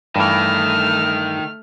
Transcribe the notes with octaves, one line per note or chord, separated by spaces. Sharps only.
G2 D#3 E3 A3 F6